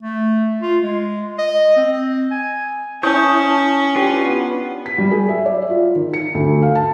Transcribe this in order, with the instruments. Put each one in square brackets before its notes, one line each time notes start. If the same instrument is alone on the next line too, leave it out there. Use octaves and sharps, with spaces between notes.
[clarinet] A3
F4
G#3
D#5
C4
G#5
[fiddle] C#4 [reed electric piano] E4 [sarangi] A5 [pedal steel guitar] C#6 D#6 G6
[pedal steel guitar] D4 F4 B4 [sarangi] G4
[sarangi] B3
[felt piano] B6
G3
G#4
E5
D5
F4
D#3
C#7
D2
F5
A5